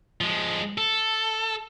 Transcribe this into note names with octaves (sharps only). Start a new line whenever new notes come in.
F3 G#3
A4